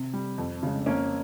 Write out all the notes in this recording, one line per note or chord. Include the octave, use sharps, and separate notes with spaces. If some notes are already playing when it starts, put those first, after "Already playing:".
Already playing: C3
G3
F2
C#3 G#3
F2 A#3 C#4